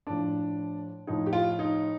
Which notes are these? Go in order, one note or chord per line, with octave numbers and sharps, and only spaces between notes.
A2 F3 D4
A2 F3 D#4
G4
F4
D#4